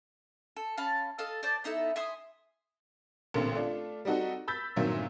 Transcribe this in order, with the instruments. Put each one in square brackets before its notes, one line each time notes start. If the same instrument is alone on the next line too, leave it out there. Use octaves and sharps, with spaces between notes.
[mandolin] A4
C#4 F5 A5 B5
A4 D#5 F5
C5 D5 A5
B3 D#4 E4 A4
E5 G#5 C6 D#6
[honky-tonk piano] A1 A#2 D3 A3 C4 A#4
A3 D4 F4
G3 C4 D#4 F#4 A4
B5 E6 G6 A6 B6
G1 A#2 D#3 F#3 C4 E5